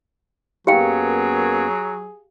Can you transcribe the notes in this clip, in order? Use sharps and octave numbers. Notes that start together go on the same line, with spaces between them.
F#2 F#3 A#3 B3 G4 G#4 F5 G5